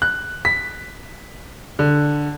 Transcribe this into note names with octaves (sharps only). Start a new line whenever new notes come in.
F#6
B6
D3